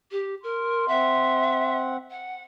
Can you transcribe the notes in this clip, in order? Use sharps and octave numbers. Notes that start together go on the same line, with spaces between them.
G4
A#4 C6
C4 E5 F#5
F#5